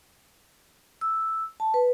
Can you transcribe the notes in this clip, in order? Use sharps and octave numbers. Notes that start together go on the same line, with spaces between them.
E6
A5
B4